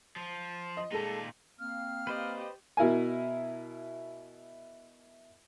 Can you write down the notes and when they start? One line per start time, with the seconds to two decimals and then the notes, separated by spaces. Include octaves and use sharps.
0.16 F3
0.77 D#5
0.92 A#2 G#3 D#4 A4
1.59 A#3 C4 F5 F6
2.07 G4 B4 C5 D5 D#5
2.77 B2 E4 A#4 G#5